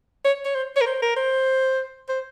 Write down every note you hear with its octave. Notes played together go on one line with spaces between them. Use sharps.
C#5
C#5
C5
C#5
A#4
C5
A#4
C5
C5